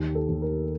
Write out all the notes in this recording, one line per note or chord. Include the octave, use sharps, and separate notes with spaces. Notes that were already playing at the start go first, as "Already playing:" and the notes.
Already playing: D#2 G4
A4
D#2
A#4